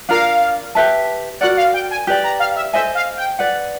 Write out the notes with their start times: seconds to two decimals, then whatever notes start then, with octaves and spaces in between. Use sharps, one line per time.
0.09 D4 F4 A#4 F5
0.75 G4 B4 E5 A5
1.41 F#4 A#4 D5 F#5
1.57 F5
1.74 G5
1.91 G#5
2.07 G4 B4 D5 G5
2.24 A#5
2.40 F5
2.56 E5
2.73 A4 C5 D#5 E5 G#5
2.95 F5
3.17 G5
3.39 B4 D5 F#5